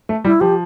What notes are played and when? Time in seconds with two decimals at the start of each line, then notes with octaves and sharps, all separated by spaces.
0.09 A3
0.25 G3 E4
0.41 F3 G4